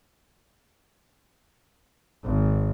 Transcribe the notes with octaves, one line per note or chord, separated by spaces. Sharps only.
G#1